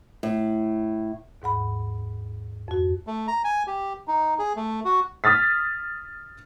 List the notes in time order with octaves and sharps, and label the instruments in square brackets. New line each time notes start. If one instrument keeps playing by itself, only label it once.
[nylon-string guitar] A2
[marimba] D#2 G#2 F#5 B5
F2 F#4
[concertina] A3
A#5
G#5
G4
D#4
G#4
A3
F#4
[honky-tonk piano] D#6 F6 A6 B6